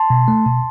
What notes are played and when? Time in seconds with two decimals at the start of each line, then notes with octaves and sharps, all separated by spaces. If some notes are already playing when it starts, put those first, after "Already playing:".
Already playing: A5 C6
0.10 B2
0.28 A3
0.46 B2